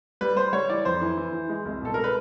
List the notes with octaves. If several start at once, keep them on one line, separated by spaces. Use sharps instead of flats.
G3 B4
G3 C5
G3 C#5
E3 D5
F2 C5
E3
E3
E3
G#3
C2
B2 A4
G#3 A#4
B4